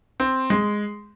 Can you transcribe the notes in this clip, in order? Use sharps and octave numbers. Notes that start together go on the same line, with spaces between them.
C4
G#3